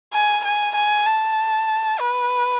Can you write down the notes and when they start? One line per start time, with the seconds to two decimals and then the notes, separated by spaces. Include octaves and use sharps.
0.13 G#5
0.44 G#5
0.75 G#5
1.06 A5
2.00 B4